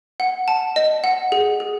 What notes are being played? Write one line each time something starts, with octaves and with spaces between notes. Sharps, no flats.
F#5
A5
D#5
F#5
G#4
G#4